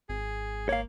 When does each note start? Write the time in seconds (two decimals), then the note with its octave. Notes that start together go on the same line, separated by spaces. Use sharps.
0.09 G#1 G#4
0.69 A#3 C#5 F5